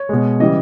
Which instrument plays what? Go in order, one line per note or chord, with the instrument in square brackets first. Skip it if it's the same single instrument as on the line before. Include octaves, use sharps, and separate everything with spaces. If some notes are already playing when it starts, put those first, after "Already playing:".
Already playing: [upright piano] C#5
B2 G#3
C#3 E3 G3 D#5